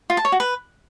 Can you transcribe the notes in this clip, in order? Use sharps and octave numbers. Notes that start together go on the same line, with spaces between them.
F4
A5
C#5
F#4
B4